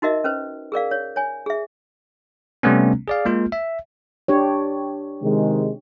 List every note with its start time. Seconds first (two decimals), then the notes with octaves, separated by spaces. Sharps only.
0.02 D#4 F#4 A#4 D#5 E5
0.24 C#4 B4 C5
0.72 G#4 A#4 D5 F5
0.91 C#5
1.16 C#5 G#5
1.46 G#4 E5
2.63 C3 G3 A3 B3 C#4
3.08 G#4 D5 F5
3.25 G#3 A#3 F4
3.52 E5
4.28 D4 G4 C#5
5.23 C3 D#3 G#3